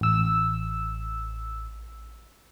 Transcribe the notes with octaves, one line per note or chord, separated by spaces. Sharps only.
A1 E6